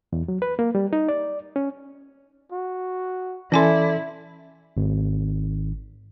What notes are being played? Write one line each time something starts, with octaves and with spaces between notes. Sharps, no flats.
E2
F#3
B4
A#3
G3
D#4
D5
C#4
F#4
E3 C#4 E4 A4 D5 G#5 C6
G#1